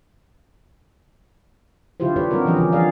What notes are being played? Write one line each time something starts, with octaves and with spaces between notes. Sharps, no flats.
D3 F#3 E4 F4 G4 C5
D4 G4 B4 C#5
G3 C4 D#4 F#4 A#4
E3 F3 C#4 G4 D#5
D3 G3 G#4
F3 G#4 D5 D#5 F5